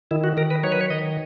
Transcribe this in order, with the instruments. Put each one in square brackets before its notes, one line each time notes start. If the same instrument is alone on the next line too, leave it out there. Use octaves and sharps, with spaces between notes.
[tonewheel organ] D#3 E4
F#4
D#3 A#4
B4
F#3 C#5
B4
C#5
D#3 D#5